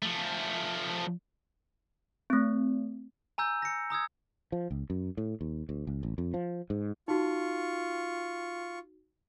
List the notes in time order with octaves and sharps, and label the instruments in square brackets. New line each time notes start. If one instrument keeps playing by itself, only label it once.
[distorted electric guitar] F3 A3
[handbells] A3 C4
[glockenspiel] G#5 A#5 E6 G6
A#6 C#7
A#5 D#6 E6 G#6
[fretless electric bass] F3
C#2
F#2
A2
D#2
D2
C#2
A1
F2
F3
G#2
[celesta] D#4 F#4 [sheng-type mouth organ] F4 C#6